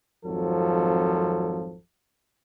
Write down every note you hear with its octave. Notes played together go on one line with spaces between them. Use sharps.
G#1 F2 F3 F#3 A4